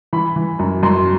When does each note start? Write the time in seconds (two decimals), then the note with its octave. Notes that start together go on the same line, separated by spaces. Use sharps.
0.13 E3 B5
0.36 E3
0.59 F#2
0.83 F#2 C6